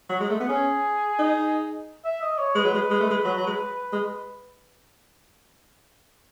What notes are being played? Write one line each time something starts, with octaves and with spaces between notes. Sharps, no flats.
F#3
G#3
A3
B3
C#4 G#4
D#4
E5
D#5
C#5
G#3 B4
F#3
G#3
G#3
A3
G#3
F#3
F#3
G#3
G#3